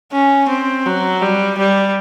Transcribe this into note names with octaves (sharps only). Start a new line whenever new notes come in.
C#4
C4
F#3
G3
G3